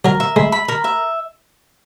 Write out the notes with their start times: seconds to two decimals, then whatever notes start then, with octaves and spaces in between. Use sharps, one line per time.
0.05 F#3 A#4
0.20 E5
0.36 G#3 B5
0.52 B5
0.68 A#4
0.84 E5